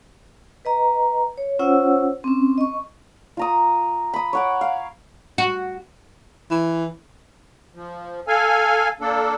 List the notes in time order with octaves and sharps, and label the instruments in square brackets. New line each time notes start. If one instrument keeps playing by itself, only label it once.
[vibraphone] B4 D#5 A#5
C#5
C#4 F4 C5 C#5 F#5 E6
C4 C#4
D#5 C#6
[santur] F4 A#5 D#6
B5 D#6
C#5 F#5 D6
F5
[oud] F#4
[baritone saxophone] E3
[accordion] F3
A4 F5 G#5
A#3 D4 A4